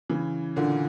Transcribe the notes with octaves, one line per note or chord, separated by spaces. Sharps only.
C#3 E3
A#2 D3